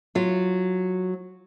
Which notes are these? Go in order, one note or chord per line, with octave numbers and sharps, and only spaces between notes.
F#3 F4